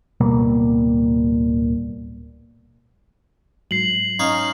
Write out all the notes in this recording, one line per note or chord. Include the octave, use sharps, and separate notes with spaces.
D1 B2 G3 A#3
G#2 F#3 C7 F#7
C#4 D#4 F5